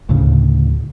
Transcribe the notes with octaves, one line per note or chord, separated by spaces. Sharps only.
D2 A2 C#3